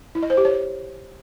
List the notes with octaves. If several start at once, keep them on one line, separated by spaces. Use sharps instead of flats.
E4
D#5
C5
G4
C#5